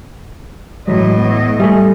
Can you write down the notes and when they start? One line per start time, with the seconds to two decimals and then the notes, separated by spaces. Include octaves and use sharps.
0.88 A2 E3 F#3 G#3 D#5
1.19 B3
1.60 G3 A3 E5 G#5 C#6